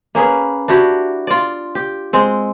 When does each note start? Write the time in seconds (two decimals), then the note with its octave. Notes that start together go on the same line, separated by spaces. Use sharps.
0.15 A#3 C#4 G#4 B4
0.68 D4 E4 F#4 G4
1.27 F4 D5
1.75 G4
2.13 G#3 C4